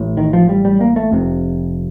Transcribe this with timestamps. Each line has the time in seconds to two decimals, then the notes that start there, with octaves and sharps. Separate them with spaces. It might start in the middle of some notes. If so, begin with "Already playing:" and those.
Already playing: A1 A2
0.17 D#3
0.33 F3
0.49 G3
0.65 G3
0.81 A#3
0.96 A3
1.12 F1 F2 C3